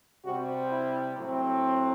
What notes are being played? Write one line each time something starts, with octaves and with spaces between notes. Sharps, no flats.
C3 G3 C4 F#4
E4
A2 F#3 C4